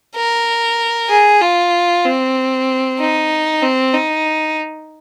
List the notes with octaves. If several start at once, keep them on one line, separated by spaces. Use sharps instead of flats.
A#4
G#4
F4
C4
D#4
C4
D#4